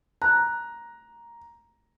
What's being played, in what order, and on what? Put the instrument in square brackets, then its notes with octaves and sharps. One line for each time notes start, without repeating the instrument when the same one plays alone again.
[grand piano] A#5 [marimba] F#6